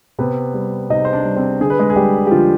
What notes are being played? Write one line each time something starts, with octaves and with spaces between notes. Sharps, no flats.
C3 B3 B4
G3
C3 D#4 D#5
C5
D4 D5
G3
C4 C5
D3 G#4
B4
G#3 G#4
G#4
G3 G#3 G4
G4
D3 F3 F4